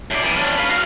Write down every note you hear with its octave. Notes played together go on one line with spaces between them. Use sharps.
F#2 D5
E3 G3
C#4 D4
B4 F5
F#4 F5